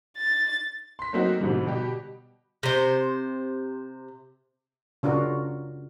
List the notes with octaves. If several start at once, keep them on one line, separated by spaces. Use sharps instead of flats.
A6
C6 B6
F#3 A3 A#3 C4 D#4 F#4
G#2 B2 D3 F3 G3
B2 G3 G4
C3 C5
C#3 D4 F4 F#4 A#4